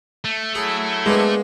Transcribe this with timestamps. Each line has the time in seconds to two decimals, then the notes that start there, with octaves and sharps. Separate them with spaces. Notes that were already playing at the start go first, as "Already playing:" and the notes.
0.25 A3
0.55 F#3 E4 G#4 A4
1.06 G#3 A#3 B3 D4